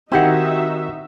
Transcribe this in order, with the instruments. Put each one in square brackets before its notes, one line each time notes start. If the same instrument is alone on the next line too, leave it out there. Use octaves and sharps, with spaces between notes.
[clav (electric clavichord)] D#3 C4 [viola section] D#4 F#4 E5 [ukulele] E4 G4 F#5